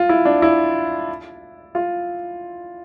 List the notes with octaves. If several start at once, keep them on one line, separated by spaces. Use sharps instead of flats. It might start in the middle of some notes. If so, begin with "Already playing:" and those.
Already playing: F4
E4
D4
E4
F4